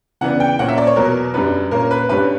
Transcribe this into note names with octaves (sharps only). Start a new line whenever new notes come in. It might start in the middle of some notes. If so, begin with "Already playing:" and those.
C#3 E3 B3 D4 F#5
G5
A#2 A#3 C#4 F#5
E5
D5
C#5
E2 B2 F#3 B3 A#4
F#2 D3 G3 B4
A#2 A#3 C#4 A#4
B4
G2 D3 G3 C#4 B4